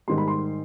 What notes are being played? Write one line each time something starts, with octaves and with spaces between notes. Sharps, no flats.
G#2 D#3 G3 C6
B5
C6